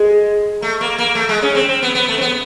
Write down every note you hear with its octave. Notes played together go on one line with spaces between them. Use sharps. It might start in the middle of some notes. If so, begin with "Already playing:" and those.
Already playing: G#3
A3
A#3
A#3
A3
G#3
C#4
C4
C4
B3
B3
A3
C4
B3